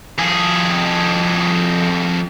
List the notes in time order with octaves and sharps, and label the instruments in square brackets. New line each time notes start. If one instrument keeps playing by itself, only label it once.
[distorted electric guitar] F2 G#4